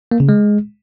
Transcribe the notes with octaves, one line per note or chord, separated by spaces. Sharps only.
A#3
C#3
G#3